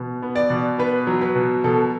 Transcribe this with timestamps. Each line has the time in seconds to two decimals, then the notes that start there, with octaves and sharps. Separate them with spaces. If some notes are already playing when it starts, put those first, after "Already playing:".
Already playing: B2
0.22 B3
0.35 D5
0.50 B2
0.78 B3 B4
1.07 F#3
1.21 B4
1.35 B2
1.64 B2 A4